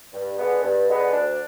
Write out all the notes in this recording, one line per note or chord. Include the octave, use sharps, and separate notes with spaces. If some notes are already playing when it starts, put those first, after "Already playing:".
G2
D3 G#3 B3
G2
D3 G#3 B3
D2 D4